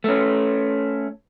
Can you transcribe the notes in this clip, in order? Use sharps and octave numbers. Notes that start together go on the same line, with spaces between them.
A3 C#4